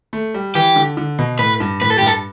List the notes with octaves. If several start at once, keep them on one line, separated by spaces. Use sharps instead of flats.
A3
G3
E3 G4
D3
D3
B2
A2 B4
G2
A2 B4
A4
A2 G4
G2 A4